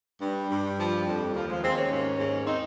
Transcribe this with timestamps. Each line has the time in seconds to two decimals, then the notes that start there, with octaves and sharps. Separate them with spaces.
0.21 G2 G3
0.51 G2
0.78 F3
1.07 F2
1.34 D#2 F3
1.49 F3 G#3
1.63 D#2 G#3 C4
1.77 A#3 C#4
1.91 G#2
2.19 G#2
2.47 C4 D#4